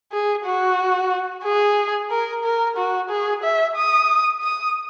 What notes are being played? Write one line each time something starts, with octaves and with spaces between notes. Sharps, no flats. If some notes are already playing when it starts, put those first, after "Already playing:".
G#4
F#4
G#4
A#4
A#4
F#4
G#4
E5
D#6
D#6